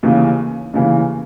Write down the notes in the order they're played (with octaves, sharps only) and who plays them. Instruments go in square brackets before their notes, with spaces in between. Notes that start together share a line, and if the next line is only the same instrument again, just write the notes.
[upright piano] D#2 C#3 E3
D#2 C#3 E3